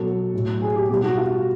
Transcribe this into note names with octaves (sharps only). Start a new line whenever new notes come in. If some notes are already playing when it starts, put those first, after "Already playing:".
Already playing: B2 F#3 A4
A2 F#3
G#4
G4
B2 G3 G4
F#4
F4